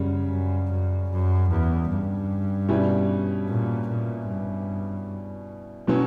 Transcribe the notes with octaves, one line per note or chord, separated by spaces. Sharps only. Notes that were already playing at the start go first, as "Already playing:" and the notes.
Already playing: F#2 C#3 G3 C#4
F#2
F#2
F#2
E2
G2
B2 G3 C#4 E4
A#2
A#2
G2
B2 F#3 C#4